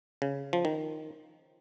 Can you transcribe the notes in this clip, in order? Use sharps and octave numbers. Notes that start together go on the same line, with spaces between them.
C#3
F3
D#3